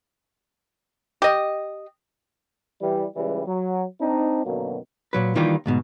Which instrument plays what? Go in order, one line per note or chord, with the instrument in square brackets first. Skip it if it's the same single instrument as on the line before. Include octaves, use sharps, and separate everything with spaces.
[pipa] G4 D#5
[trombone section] E3 G3
C#2 C#3 E3 G3
F#3
C4 D4 D#4
F#2 B2 D3 D#3 F#3 A#3
[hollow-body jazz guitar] A#2 F#3 B4
D#3 E3 G3 A#3 F4 G4
D2 G#2 B2